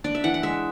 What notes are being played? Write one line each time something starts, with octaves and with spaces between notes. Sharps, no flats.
D4 D5
E5
E3 F#5
F#5
G#3 E5